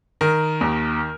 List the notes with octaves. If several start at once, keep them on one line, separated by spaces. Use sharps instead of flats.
D#3 A#4
D#2